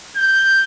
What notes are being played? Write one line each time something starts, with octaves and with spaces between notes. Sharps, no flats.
G6